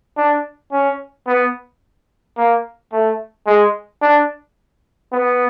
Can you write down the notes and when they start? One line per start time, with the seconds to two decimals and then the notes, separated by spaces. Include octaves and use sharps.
0.17 D4
0.72 C#4
1.28 B3
2.37 A#3
2.92 A3
3.47 G#3
4.02 D4
5.12 B3